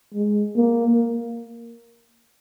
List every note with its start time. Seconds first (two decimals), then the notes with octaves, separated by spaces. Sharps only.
0.14 G#3
0.57 A#3